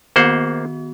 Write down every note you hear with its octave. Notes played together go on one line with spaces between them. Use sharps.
D#3 A#3 B3 F#4 C5 F#5